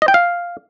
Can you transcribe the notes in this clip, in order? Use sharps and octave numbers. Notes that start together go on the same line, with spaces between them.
D#5
G5
F5